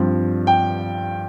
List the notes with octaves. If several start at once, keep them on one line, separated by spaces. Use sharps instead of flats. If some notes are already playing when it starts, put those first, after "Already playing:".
Already playing: G2 F3 C4
G5